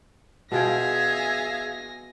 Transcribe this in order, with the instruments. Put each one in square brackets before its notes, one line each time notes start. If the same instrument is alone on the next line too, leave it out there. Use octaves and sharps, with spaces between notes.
[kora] B2 F4 G5 [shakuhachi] G#4 [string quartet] E5 F5 [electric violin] G#5 A#6